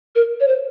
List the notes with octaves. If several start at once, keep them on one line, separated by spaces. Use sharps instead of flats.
A#4
C#5
C5